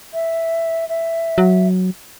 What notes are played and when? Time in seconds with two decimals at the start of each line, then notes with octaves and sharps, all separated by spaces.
0.13 E5
0.89 E5
1.38 F#3